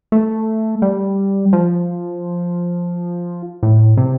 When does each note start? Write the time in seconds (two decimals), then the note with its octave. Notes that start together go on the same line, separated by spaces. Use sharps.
0.12 A3
0.82 G3
1.53 F3
3.63 A2
3.97 C3